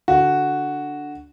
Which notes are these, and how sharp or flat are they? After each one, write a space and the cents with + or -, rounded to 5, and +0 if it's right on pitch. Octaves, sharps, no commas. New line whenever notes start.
D3 +0 F#4 +0